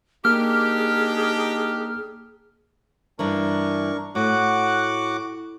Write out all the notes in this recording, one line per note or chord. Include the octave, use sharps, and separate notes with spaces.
A#3 D4 D#4 G4 G#4 F6
G2 E3 D4 A#4 C#6
A2 F#4 F#5 D6